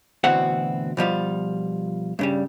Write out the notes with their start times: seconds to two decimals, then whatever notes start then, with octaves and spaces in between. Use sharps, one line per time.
0.24 D2 B2 E3 C4 F#4 F#5
0.97 B2 F3 G3 F4
2.19 G2 C#3 G3